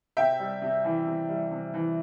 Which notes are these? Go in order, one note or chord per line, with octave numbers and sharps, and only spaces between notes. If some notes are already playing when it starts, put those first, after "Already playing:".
C3 E5 G5
G3
C3
E3
C3
G3
C3
E3